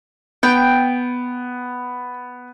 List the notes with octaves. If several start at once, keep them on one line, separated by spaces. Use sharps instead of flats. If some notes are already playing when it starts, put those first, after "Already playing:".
B3 G5